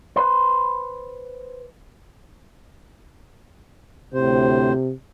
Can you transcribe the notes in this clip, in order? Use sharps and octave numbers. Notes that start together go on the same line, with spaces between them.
B4 C5
D2 A2 C3 C5